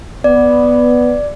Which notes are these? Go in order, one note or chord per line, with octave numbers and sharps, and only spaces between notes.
B3 D5